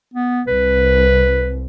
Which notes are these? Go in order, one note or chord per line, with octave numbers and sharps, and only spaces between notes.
B3
C2 B4